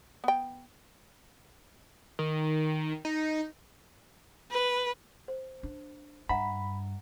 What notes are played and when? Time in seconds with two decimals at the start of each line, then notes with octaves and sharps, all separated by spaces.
0.24 B3 G5
2.19 D#3
3.05 D#4
4.51 B4
5.28 C5
5.63 D4
6.29 G2 D4 E5 F#5 A#5 B5